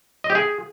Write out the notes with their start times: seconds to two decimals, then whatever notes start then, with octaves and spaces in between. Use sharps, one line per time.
0.24 D#5
0.30 G4
0.35 G#4